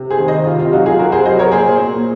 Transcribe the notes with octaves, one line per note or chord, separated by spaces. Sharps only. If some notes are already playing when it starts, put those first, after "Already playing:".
Already playing: C3
G#4 C5
D#3
C5 D#5
C3 F4
F4
F#3 D#4 F#4
F4 G#4
C3 F#4 A#4
G#4 C5
F#3 C5 D#5
A#4 C#5
A#2 G#4 C5
A#2